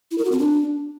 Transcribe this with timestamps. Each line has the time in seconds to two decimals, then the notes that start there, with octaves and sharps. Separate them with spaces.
0.11 E4
0.18 A#4
0.25 F#4
0.32 C4
0.39 D4